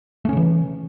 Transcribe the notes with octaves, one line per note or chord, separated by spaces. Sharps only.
C#3 E3 A3 C#4